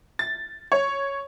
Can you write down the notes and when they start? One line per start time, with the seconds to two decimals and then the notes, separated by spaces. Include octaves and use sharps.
0.19 A6
0.72 C#5